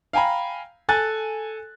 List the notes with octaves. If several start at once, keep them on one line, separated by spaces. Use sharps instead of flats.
F5 G5 G#5 A#5 B5
A4 G#5 F#6 A6